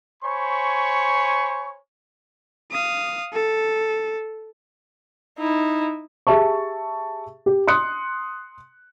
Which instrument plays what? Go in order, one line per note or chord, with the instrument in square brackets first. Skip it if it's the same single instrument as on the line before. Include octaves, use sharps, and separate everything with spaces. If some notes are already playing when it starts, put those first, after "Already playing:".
[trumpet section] C5 C#5 G#5 B5 C#6
[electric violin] F5 D#6
A4
[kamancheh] D#4 E4
[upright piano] G4 G#4 E5 A5 C#6
G4
C6 D#6 F#6 C#7